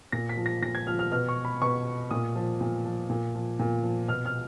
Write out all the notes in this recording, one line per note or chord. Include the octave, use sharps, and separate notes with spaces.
A#2 A#6
B6
F3
A#6
A#2 A#6
G#6
F3 F6
F6
B2 F6
C#6
B5
B2 C#6
A#2 D#6
F3
A#2
F3
A#2
F3
A#2
F3
B2 F6
F6